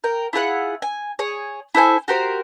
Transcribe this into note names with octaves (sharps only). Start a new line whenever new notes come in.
A#4 G5
E4 F4 G#4 F#5
G#5
G#4 C#5
E4 A4 C5 G#5
F#4 G4 A#4 C5